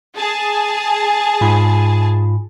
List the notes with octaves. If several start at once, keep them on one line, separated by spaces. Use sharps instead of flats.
G#4 A5
G#2 F4 B5